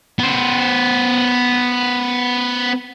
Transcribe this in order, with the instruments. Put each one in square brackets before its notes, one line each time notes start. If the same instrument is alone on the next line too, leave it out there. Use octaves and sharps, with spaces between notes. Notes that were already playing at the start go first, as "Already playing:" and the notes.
[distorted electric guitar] B3 C5